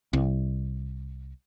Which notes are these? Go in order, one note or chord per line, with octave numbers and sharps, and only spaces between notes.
C2